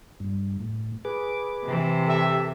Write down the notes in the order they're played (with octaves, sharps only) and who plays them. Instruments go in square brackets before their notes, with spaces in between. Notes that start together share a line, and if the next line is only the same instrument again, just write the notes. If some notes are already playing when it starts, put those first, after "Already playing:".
[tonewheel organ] G2
A2
G#4 B4 D6
[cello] C3 E3
[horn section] G4 E5 [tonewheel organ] A4